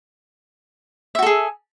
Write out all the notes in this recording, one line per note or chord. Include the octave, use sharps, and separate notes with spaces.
F#4 G#4 A4 E5